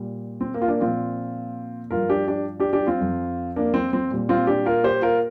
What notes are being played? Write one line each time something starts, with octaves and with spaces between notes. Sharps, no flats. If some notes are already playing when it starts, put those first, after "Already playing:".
Already playing: A#2 G3
C4
A#3
F4
A#3 D4
A#2 F3 C4 F4
G2 F3 F4 A#4
D4 G4
D4 G4
D4 G4
D4 G4
C4 F4
F2 F3
A#3 D4
C4
C4
A#2 G3
C4 F4
D4 G4
F4 A#4
G4 C5
F4 A#4